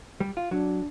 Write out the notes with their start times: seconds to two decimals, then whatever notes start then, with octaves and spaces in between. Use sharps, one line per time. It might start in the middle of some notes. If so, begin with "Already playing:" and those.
0.20 G3
0.37 F4
0.51 F#3 D4